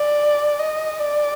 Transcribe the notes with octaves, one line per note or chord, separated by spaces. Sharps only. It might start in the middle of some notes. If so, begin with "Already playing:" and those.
Already playing: D5
D#5
D5